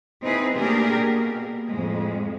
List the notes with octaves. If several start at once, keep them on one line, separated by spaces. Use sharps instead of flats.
C4 D#4 E4 G#4 B4
A3 A#3 D4 G4 G#4 A#4
B2 A#3
F2 A2 G#3